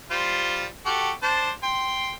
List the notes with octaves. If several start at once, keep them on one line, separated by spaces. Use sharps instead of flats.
G3 F4 C5
F#4 G4 A4
D4 C5 A5
G5 C6